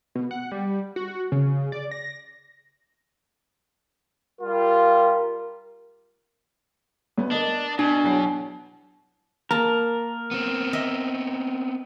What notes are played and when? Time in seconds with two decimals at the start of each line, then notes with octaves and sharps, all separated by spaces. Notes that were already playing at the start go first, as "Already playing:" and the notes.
0.15 B2
0.31 F#5
0.51 G3
0.96 F#4
1.32 C#3
1.72 D5
1.91 A#6
4.41 G3 F4 A#4
7.18 D2 B3
7.31 D4 A#4 D#5
7.79 B2 D4
8.03 E2 F#3 C7
9.51 A#3 A#4 A5
10.31 B3 C4
10.73 D#5 E5